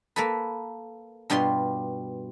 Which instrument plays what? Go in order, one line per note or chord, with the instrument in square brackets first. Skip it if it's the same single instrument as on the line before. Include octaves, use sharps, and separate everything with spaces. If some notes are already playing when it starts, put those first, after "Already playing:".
[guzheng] A#3 A4 B4
G2 B2 G3 F4 C6